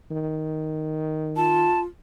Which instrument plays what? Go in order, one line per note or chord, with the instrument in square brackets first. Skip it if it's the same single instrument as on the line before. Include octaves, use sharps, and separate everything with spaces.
[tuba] D#3
[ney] F4 [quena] A5